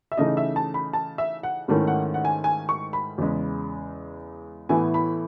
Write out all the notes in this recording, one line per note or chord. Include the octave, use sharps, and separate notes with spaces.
E5
C#3 E3 A3 D#4 D#5
E5
A5
B5
A5
E5
F#5
G#2 D#3 A3 C#4 E4
F#5
F#5
G#5
G#5
C#6
B5
E2 C#3 G#3
A2 E3 B3 E4 G#5
B5